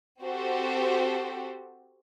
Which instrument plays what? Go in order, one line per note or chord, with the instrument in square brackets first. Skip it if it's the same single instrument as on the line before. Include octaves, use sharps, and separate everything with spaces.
[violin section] C4 F#4 G4 A4 C5